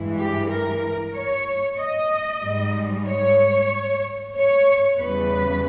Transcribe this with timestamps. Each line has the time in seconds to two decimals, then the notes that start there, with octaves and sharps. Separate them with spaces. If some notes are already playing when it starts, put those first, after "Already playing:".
Already playing: G2 E3 G#3
0.18 G4
0.50 A#4
1.15 C#5
1.79 D#5
2.43 G#2 G3
3.07 C#5
4.36 C#5
5.00 E2 C#3 G3 B4